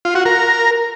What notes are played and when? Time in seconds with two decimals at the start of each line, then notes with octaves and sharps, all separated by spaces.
0.05 F4
0.15 F#4
0.26 A#4